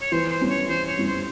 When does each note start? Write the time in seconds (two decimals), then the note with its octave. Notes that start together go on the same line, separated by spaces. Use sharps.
0.01 C#5
0.12 E3 C5
0.31 C5
0.41 G3 C#4 E4
0.50 C#5
0.69 E3 C5
0.87 C#5
0.97 G3 C#4 E4
1.07 C5